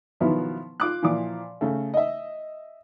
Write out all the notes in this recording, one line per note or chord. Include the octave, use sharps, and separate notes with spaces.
B2 D#3 F3 F#3 B3 E4
F4 D6 F#6
A#2 E3 F3 D6
C#3 A3
D#5 E5